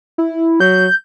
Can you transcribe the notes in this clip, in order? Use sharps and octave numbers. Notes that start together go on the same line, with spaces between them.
E4
F#3 G6